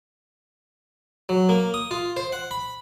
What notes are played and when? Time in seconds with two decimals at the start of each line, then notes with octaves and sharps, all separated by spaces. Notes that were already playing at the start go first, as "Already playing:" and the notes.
1.29 F#3
1.49 A#3
1.74 D#6
1.91 F4
2.17 C5
2.32 F#5
2.51 B5